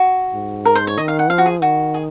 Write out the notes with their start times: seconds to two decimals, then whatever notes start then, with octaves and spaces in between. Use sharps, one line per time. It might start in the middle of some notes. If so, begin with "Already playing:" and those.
Already playing: F#4
0.33 G#2
0.65 A#4
0.75 C5
0.87 C#5
0.98 D#3 D#5
1.08 F5
1.19 F#5
1.30 F3 F5
1.38 F#4
1.46 G#4
1.62 D#3 F#4
1.94 G#4